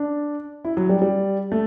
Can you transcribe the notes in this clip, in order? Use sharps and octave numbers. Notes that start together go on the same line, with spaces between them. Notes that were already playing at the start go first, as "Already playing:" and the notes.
Already playing: D4
E4
F#3
G3
G3
A3